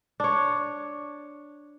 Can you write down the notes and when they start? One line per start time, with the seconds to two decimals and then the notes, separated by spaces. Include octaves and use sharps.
0.20 D4 C#5